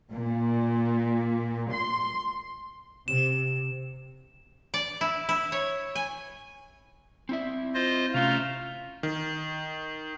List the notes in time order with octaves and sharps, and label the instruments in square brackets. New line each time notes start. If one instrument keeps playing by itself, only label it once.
[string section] A#2
C6
[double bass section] C3 [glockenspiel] E7
[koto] D5
E4
E4
C#5
G#5
[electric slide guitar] C4 E4 E5
[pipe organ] F4 C5 D#5
[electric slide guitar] C3 C#4 [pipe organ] A3 A#5 [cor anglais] F4
[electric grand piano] D#3